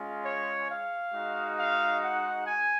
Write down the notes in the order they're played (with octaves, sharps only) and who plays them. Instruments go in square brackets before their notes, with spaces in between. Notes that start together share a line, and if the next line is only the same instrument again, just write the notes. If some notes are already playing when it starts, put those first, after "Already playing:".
Already playing: [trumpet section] G#3 C#4 F4
C#5
F5
G#3 D#4 F#4
F5
F#5
G#5